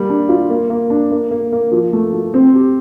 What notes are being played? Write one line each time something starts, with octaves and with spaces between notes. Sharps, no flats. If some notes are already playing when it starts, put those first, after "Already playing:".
Already playing: G3 A#3
D4
F4
A#3
A#3
D4
A#3
A#3
A#3
F3
A3
F3
C4
G4